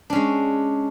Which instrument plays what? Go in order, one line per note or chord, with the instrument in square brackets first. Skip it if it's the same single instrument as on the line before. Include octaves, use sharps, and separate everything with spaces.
[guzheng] D4
C#4
G#3